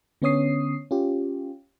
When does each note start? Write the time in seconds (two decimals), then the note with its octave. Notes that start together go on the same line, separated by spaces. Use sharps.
0.22 D3 B3 C#4 C#5 D#6 C7
0.91 C#4 F4 G4